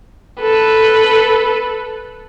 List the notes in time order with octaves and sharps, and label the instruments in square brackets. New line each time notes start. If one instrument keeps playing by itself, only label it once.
[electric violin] A4 B4